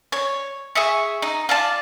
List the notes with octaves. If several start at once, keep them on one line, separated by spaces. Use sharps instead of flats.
C#5
G#4 E5 C#6
D#4
F4 D5 A5